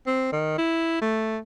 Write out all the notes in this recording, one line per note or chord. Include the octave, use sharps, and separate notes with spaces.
C4
D#3
E4
A3